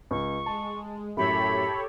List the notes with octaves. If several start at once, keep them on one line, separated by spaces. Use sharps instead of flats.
C#2 C#6
G#3 A5
F#2 A2 G4 A4 C#5 B5